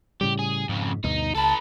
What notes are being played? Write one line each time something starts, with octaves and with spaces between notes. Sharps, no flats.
A2 C#3 G3 G4
G#4
F2 G#2 C#3
D2 G2 B2 D#4
C#2 A4 B4 A5